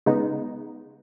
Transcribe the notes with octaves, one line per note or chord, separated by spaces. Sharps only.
C#3 G#3 B3 D#4